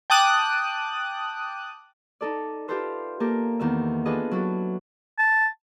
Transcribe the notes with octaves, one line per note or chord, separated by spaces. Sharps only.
G5 A5 D6 D#6 F#6
D#4 A4 D5
F4 G4 A4 B4 C5 E5
A#3 G4 A4 A#4
E2 D#3 E5
D4 F4 G#4 A4 B4 D#5
F#3 E4 A4
A5